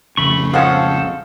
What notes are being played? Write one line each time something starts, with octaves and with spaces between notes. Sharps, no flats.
A#1 F2 C#3 A3 B5 C#6
F3 G#3 C4 C#4 A4 F5 F#5